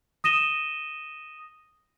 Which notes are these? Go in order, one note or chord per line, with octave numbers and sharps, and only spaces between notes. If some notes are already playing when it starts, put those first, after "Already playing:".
D#6 A#6 D#7 E7 G7